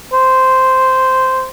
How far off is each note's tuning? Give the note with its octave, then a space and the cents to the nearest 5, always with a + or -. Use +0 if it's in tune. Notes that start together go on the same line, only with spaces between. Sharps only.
C5 -10